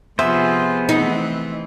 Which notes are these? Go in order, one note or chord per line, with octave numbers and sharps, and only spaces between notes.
C3 F3 B3 F4 G#4 C5 E5
E3 A3 C4 D#4